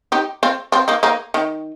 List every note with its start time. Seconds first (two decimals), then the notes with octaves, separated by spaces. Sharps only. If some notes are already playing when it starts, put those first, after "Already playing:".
0.12 D#4 G4
0.43 C4 F4
0.72 C4 F4
0.88 A#3 D#4
1.03 A#3 D#4
1.34 D#3